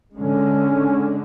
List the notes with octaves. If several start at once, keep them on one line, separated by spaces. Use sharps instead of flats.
D3 G#3 C#4